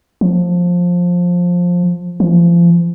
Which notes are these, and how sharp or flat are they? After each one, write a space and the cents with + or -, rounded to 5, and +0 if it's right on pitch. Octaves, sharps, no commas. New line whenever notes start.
F3 +15
F3 -30